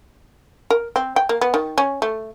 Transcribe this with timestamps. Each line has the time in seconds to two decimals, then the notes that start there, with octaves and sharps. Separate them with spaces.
0.70 A#4
0.96 C4
1.16 G5
1.29 A#3
1.41 B3
1.54 D#3
1.78 C#4
2.02 A3